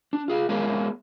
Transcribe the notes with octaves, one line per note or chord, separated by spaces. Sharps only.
D4
F4 G#4 F5
G#3 B3 G#4 A#4 C#5 F5